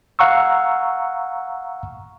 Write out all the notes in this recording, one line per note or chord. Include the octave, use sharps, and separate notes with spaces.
F5 F#5 A#5 C#6 E6